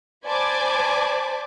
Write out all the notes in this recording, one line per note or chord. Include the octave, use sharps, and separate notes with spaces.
C5 D5 G#5 A5 B5 D6